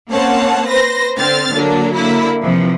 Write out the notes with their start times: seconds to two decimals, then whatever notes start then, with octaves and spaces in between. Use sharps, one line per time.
0.11 A#3 C4 C#4 C#5 F#5 A5
0.67 B4 C5 A#6
1.18 D3 C4 F6 A6
1.55 D3 F#3 A#3 D4
1.95 D3 A#3 E4
2.42 C3 E3 F3